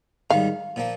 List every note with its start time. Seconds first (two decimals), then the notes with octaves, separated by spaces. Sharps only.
0.30 G#2 D#3 G3 F5
0.76 A#2 F3 A#3